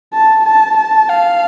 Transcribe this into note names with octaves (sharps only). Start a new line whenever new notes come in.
A5
A5
A5
F5